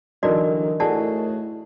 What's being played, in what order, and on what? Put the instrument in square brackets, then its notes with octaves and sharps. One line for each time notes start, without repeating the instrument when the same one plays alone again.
[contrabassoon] D3 [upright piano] E3 F#3 [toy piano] D#4 F#4 D5 [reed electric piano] A#4 D#5
[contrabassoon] A2 [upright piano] A3 F#4 G#4 [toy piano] D5 F#5 A5